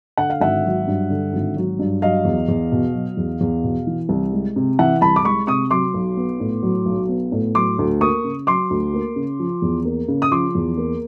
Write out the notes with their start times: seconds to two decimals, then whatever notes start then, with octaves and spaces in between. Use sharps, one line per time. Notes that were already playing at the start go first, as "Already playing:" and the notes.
0.17 D3 F#5
0.30 F5
0.40 G#1 E5 F#5
0.64 F#3
0.87 G2
1.10 D3
1.33 G#1
1.56 F#3
1.79 G2
2.02 F#3 D#5 F5
2.25 E2
2.48 E2
2.72 B2
2.94 F#3
3.17 E2
3.41 E2
3.64 B2
3.87 E3
4.09 C2
4.33 G#3
4.56 C3
4.79 E3 E5 F#5
5.01 C2 A5 B5
5.16 D6
5.25 G#3 B5 C#6
5.47 C3 C#6 D#6
5.71 F#3 C6 D6
5.94 B1
6.17 B3
6.40 A2
6.63 F#3
6.86 B1
7.09 B3
7.32 A2
7.55 F#3 C6 D6
7.78 D2
8.01 A#3 C#6 D#6
8.24 C#3
8.47 F#3 C6 D6
8.70 D2
8.94 A#3
9.16 C#3
9.40 F3
9.62 E2
9.85 A#3
10.08 C#3
10.22 D#6
10.32 F3 C6 D6
10.55 E2
10.78 A#3